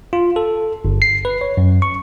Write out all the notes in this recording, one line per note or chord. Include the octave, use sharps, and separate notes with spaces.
F4
A4
G1
C7
B4
C#5
F#2
C#6